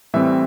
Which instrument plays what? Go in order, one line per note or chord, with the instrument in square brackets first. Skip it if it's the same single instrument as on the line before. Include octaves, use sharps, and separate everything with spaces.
[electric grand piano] A2 E3 G3 C4 E5